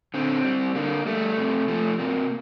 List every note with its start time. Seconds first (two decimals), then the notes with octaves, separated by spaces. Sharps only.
0.14 D3 C4
0.45 G3
0.75 D3 A#3
1.06 G3 A3
1.38 C3
1.68 F3 A3
1.99 C3 A#3